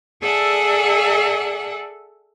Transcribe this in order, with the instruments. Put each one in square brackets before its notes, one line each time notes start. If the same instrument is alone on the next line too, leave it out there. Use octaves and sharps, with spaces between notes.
[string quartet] G#4 A4 D5 E5 F#5 G#5